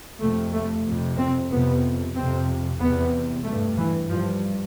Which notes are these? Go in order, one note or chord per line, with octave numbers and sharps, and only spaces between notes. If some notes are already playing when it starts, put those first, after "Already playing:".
F2 C3 A3
A3
F2 C3
C4
F2 C3 B3
F2 C3 C4
E2 C3 B3
G2 A3
E3
G2 F3